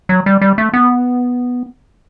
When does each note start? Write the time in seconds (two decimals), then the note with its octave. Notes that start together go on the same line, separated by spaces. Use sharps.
0.09 F#3
0.26 G3
0.41 G3
0.58 A3
0.73 B3